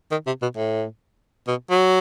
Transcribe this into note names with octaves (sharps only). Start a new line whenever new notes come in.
D#3
C3
B2
A2
B2
F#3